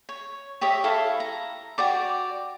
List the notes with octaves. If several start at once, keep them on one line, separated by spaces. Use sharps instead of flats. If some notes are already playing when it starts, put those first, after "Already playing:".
C#5
G4 C#5 D#5 E5
E4 A4 F5
A#5
F#4 G4 D5 D6